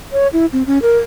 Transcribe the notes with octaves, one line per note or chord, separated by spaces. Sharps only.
C#5
E4
C4
C#4
A#4